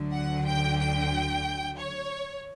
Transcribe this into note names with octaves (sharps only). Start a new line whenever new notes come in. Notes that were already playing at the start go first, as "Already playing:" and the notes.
Already playing: D2 D3 F#3
F#5
G5
G5
C#5